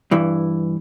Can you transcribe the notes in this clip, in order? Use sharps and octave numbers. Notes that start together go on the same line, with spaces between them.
G2 E3